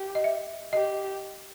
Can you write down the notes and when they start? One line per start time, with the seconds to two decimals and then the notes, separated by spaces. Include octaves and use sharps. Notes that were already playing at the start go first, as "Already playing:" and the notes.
Already playing: G4
0.15 D#5
0.24 E5
0.73 G4 D#5